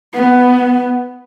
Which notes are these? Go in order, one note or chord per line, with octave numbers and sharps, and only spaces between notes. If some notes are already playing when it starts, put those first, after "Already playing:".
B3